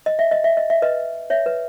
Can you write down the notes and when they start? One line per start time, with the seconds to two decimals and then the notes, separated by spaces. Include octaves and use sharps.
0.06 D#5
0.19 E5
0.31 D#5
0.44 E5
0.57 D#5
0.70 E5
0.82 B4 D#5
1.30 C#5 E5
1.46 B4